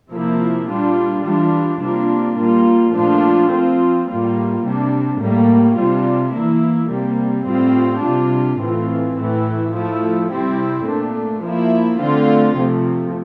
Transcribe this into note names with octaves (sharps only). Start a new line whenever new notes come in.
C3 F3 A#3 E4
A#2 G3 D4 F4
E3 G3 D4 F4
C3 G3 A#3 D4 F4
A#2 G3 A#3 F4
A#2 F3 A3 D4 F4
F3 C4 F4
A2 G3 A#3 F4
C3 G3 D4
A2 G3 A#3
C3 G3 D4 F4
E3 A#3 E4
C3 G3 A#3
A2 G3 C4 F4
C3 G3 D4 F4
A2 E3 A3 C4 F4
A2 E3 A3 E4
F3 A3 E4
C3 G3 C4 E4
A#2 A3 D4
F3 A#3 E4
D3 A3 C4 F4
C3 F3 A3